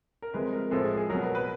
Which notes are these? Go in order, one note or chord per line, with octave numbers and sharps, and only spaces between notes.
A#4
C3 F3 G#3 B4
A#4
A2 F3 G#3 A4
G#4
G#4
B2 F#3 A#4
B4
B4